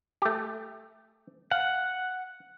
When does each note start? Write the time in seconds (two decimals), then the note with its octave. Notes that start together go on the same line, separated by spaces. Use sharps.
0.22 A3 G4
1.51 F5 F#5